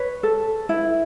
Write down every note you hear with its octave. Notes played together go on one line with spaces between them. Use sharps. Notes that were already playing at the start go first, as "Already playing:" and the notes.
Already playing: B4 C#5
A4
E4